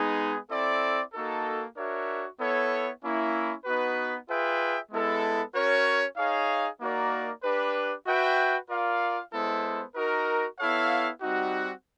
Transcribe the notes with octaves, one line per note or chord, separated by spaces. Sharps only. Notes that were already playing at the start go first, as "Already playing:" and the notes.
Already playing: G#3 B3 D#4 G#4
C4 E4 A4 D5
A#3 D#4 F#4 A4
D4 F#4 A#4 C#5 E5
B3 E4 A4 C#5
A#3 C#4 E4
B3 D#4 F#4 B4
F4 G#4 B4 E5 G5
G#3 B3 E4 A4
C#4 F#4 A#4 C#5
D#4 G#4 C#5 F5
A#3 D#4 F#4 A#4 D5
D4 G4 B4
F#4 B4 E5 G5
F4 A#4 D5 F5
G#3 B3 E4 A4 C5
D#4 F#4 A#4
B3 E4 A4 C#5 F5
G3 C4 D#4 F#4